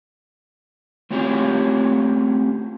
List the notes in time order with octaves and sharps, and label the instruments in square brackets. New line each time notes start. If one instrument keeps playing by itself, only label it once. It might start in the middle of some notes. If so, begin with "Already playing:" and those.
[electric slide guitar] A3 C4 C#4 F4 G4 G#4